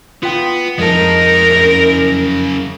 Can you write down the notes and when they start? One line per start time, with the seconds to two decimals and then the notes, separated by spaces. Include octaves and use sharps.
0.23 B3 F4 G5
0.79 F2 G#3 D#4 E4 A#4 A5
1.51 F#2 C#3